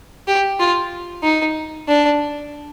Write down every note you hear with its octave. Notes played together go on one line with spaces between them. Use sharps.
G4
F4
D#4
D4